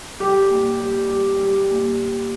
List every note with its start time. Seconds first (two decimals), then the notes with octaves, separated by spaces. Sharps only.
0.20 G3 G4
0.50 A#2
0.80 G3
1.10 G3
1.40 G3
1.70 A#2